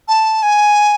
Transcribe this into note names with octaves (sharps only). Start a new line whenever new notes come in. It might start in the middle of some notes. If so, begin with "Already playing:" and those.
A5
G#5